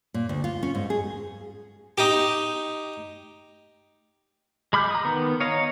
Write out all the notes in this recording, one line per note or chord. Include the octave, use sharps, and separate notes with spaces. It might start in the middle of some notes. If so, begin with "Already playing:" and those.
A#2
D2
F4
C#4
G#2
G#4
D#4 G4
G#3 B5 D6 F6 G6
A#5 D#6
D#3 B3
C#5 D#5 F5 A#5